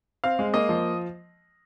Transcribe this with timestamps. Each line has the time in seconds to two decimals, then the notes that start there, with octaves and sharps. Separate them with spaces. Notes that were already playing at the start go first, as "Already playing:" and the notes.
0.24 C4 F5
0.39 G#3
0.54 A#3 D#5
0.69 F3